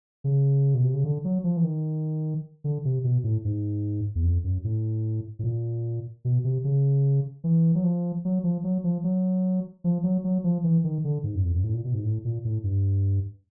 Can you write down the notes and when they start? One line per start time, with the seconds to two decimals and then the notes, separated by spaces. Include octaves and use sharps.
0.24 C#3
0.74 B2
0.84 C3
0.94 C#3
1.04 D3
1.24 F#3
1.44 F3
1.57 E3
1.64 D#3
2.64 D3
2.85 C3
3.04 B2
3.24 A2
3.45 G#2
4.15 E2
4.24 F2
4.44 F#2
4.64 A2
5.39 A2
5.44 A#2
6.25 B2
6.44 C3
6.64 C#3
7.44 E3
7.75 F#3
7.84 F3
8.25 F#3
8.44 F3
8.64 F#3
8.84 F3
9.04 F#3
9.84 F3
10.04 F#3
10.24 F#3
10.44 F3
10.64 E3
10.84 D#3
11.04 D3
11.24 G#2
11.35 F#2
11.45 F2
11.54 F#2
11.64 A2
11.74 A#2
11.84 B2
11.94 G#2
12.04 A2
12.25 A#2
12.45 A2
12.64 G2